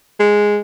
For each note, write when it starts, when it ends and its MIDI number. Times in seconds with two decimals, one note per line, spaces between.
0.19 0.58 56